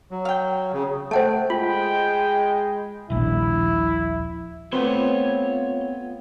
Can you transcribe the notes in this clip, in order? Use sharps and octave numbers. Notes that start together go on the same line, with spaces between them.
F#3
F5 G5
C#3
A3 C5 F#5 G5 A5
G#3 F4 G5 B5
D#1 A#1 E4
A3 B3 C4 F4 B4 C#5 C6